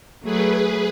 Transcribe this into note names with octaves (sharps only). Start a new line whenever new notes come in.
F#3 A3 G#4 B4